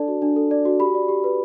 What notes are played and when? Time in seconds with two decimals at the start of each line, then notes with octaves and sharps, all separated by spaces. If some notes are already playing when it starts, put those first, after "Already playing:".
Already playing: D4 A4 D5 A5
0.08 F#4
0.22 D4
0.36 A4
0.51 D5
0.65 F#4
0.79 G4 B5
0.95 D5
1.09 G4
1.24 B4